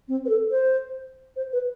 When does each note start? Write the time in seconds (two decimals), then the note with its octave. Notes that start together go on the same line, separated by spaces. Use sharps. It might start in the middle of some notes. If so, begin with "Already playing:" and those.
0.08 C4
0.25 B4
0.29 A4
0.51 C5
1.36 C5
1.53 B4